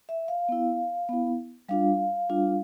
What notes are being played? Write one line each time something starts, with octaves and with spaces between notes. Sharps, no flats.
E5
F5
B3 E4
B3 E4
G3 D4 F4 F5
G3 D4 F4